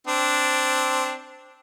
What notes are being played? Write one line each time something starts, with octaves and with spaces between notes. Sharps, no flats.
C4 D4